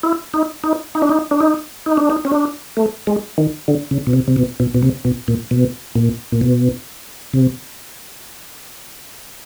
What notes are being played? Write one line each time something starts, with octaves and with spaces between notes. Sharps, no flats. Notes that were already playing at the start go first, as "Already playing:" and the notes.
E4
D#4
D#4
D#4
D4
D#4
D4
D#4
D#4
D4
D#4
C#4
D4
A3
G#3
D#3
D3
C#3
B2
C3
C3
B2
B2
B2
C3
B2
A#2
B2
A#2
A#2
B2
C3